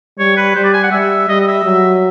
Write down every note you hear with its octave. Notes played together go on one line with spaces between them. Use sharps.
G3 C#5
B4
G3 C5
D5
G#5
F#5
G3 E5
G3 D#5
D#5
E5
F#3